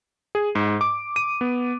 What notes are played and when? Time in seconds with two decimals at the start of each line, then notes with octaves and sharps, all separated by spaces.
0.35 G#4
0.55 G#2
0.81 D6
1.16 D#7
1.41 B3